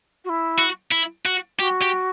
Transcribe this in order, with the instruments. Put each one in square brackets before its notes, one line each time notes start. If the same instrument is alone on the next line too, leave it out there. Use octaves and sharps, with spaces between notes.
[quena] F#4
E4
[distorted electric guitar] F#4
E4
F#4
[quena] F#4 [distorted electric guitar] G4
[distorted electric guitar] G4